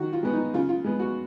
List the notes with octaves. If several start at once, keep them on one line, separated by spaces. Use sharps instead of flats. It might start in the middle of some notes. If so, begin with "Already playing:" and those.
Already playing: D#3 F#4
F4
G#3 B3
D#4
C#3 F4
F4
G#3 B3
F#4